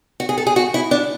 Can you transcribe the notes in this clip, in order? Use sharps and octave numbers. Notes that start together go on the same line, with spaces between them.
F#4
G#4
A4
G#4
F#4
E4
D4